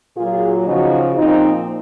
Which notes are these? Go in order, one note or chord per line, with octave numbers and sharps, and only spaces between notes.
A#2 F#3 F4 G#4
C#3 F3 D#4 F#4
A#2 F3 C4 D#4